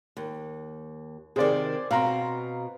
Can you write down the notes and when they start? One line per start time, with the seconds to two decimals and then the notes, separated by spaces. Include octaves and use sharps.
0.17 D#2
1.36 C3 D#3 G#4 C5 D5
1.91 B2 C4 F5 A#5 C6